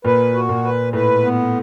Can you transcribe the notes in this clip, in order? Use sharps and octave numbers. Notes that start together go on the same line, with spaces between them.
A#2 A#3 B4
F#4
A#2 A#3
B4
A2 A3 B4
B3